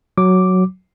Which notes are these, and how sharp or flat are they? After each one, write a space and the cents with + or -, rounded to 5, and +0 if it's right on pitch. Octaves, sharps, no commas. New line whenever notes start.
F#3 +0 D6 +0